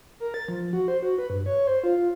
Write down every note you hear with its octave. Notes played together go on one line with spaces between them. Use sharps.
A#4
A6
F3
F#4
C5
F#4
B4
G2
C#5
C5
F4
F4